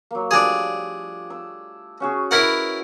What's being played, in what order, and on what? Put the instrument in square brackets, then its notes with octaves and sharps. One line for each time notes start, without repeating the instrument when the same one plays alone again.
[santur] F#3 A#3
[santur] F3 G3 A3 [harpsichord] D4 G#4
[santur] E6
C#4 F#4 G#4
[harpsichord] E4 A#4 F#5 [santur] B4 C#5 D#5